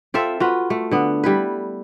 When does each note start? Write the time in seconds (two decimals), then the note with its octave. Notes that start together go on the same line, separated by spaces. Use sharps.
0.14 C4 F4 A4 E5
0.40 F4 F#4 B4
0.70 A3
0.91 D3 B3
1.24 G3 E4 B4